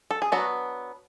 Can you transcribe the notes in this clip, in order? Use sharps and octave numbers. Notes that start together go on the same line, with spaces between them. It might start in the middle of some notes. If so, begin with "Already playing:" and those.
A4
G#4
F#3 B3 D4 F#4